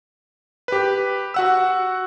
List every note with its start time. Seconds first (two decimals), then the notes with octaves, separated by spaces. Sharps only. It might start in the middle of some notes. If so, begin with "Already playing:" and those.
0.68 G4 B4
1.34 F#4 F#5 E6